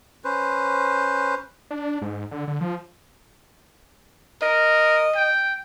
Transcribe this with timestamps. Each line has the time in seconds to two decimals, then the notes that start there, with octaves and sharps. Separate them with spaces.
0.24 C#4 B4 C5
1.71 D4
2.02 G#2
2.31 D3
2.48 D3
2.61 F3
4.42 A#4 D#5
5.16 G5